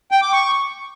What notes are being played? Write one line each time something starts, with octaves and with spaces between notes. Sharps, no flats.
G5
D6
C#6